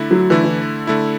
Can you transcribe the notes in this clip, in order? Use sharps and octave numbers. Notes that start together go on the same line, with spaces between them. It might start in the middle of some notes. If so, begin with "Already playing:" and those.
Already playing: D3 A3 E4
F#3
D3 E3 A3 E4
E3
D3 A3 E4